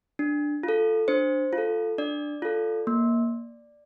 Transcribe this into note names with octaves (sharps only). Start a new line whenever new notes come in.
D4
F4
A4
D4 C5
F4
A4
D4 D5
F4 A4
A#3